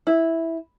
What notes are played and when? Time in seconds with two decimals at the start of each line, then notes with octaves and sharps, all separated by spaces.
0.07 E4